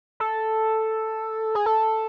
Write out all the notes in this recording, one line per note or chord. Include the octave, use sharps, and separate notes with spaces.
A4
G#4
A4